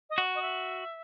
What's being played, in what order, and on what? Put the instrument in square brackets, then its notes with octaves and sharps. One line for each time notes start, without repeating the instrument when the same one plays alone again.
[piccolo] D#5
[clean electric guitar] F#4
[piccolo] D#5
E5